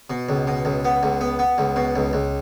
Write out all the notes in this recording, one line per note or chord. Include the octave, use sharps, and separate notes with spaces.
B2
C#2
B2
C#2
B3
C#2
B3
B3
C#2
B2
C#2
C#2